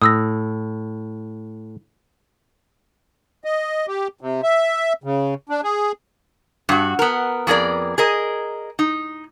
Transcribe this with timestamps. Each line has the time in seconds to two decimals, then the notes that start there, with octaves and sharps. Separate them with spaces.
0.02 A2 D#6 E6 A#6
3.44 D#5
3.88 G4
4.21 C3
4.43 E5
5.04 C#3
5.49 D4
5.63 G#4
6.69 G2 F#4
6.99 B3 A#4
7.47 F2 B3 G#4 A#4 D5
7.98 G#4 A#4 D#5
8.79 D#4